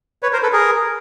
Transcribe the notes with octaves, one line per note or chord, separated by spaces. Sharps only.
B4 C#5
A#4 C5
A4 B4
G#4 A#4